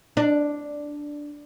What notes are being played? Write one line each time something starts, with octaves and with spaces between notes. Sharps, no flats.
D4